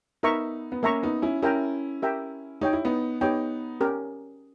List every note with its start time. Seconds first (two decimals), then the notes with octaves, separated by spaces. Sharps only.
0.23 B3 D#4 A#4 E5 A#5 C#6
0.72 B3
0.83 A#3 C#4 A#4 E5 A#5 C#6
1.03 B3 D#4
1.22 C#4 E4
1.42 C#4 E4 G4 A#4 E5 G5 A#5
2.02 G4 A#4 E5 G5 A#5
2.61 D#4 G4 C#5 G5
2.73 E4
2.85 B3 D#4
3.21 B3 D#4 G4 C#5 G5
3.81 C#4 G4 A#4